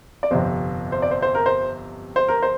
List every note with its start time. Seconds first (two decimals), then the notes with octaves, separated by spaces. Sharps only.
0.23 D5
0.31 G1 F2 C3 C5
0.92 C5
1.02 D5
1.11 C5
1.22 C5
1.35 A#4
1.46 C5
2.16 C5
2.28 A#4
2.42 C5